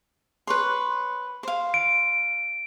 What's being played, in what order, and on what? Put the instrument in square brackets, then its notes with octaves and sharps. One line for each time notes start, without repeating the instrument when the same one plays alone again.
[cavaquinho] B4 C#5 C6
C5 F5
[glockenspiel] D7